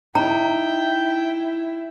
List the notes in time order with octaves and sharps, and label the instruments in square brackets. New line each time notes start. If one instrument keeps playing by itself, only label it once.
[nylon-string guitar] D#4 [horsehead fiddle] E4 [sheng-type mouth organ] G5 [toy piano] A#5